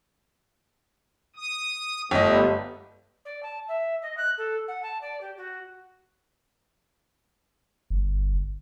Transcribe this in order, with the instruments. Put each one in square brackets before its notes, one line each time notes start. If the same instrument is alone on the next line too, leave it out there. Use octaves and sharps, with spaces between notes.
[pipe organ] D#6
[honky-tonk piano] G1 D#5 [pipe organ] G3 A3 B3
[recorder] D5
A5
E5
D#5
F#6
A4
F#5
A5
D5
G4
F#4
[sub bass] G1